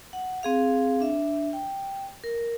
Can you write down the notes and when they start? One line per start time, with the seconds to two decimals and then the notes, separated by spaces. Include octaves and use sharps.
0.13 F#5
0.43 C4 G#4 F5
1.00 D4 E5
1.53 G5
2.24 A#4